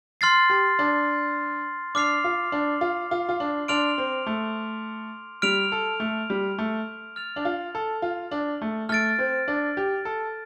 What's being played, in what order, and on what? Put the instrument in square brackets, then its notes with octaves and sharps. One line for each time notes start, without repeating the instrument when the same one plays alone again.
[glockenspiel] C6 F6 A6 C7
[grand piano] G4
D4
[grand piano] D4 [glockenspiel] D6 F6 C7 F7
[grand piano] F4
D4
F4
F4
F4
D4
[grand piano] D4 [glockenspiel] C6 F6 D7 F7
[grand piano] C4
A3
[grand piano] G3 [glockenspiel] F6 D7 F7
[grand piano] A4
A3
G3
A3
[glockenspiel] F6 A6 F7
[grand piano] D4
F4
A4
F4
D4
A3
[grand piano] A3 [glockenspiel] F6 A6 D7
[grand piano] C4
D4
G4
A4